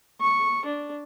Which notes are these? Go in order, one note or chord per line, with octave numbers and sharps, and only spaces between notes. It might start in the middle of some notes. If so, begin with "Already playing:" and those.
C#6
D4